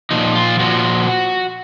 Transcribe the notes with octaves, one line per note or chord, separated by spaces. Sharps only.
A#2 F3 D#4
F4
A#2 F3 F#4